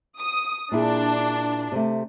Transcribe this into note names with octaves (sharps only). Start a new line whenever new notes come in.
D#6
A#2 D4 E4 G#4
C3 A3